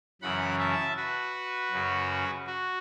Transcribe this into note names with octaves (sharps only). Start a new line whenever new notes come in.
F#2 C#3 E3 F#5 B5
E5 A5
F#4 B4
F#2 C#3 F#3
F#4